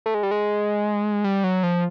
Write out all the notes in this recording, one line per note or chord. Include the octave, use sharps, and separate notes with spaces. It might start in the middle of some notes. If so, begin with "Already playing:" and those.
A3
G#3
G3
G#3
G3
F#3
F3